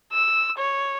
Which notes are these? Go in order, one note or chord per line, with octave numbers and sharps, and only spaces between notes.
E6
C#5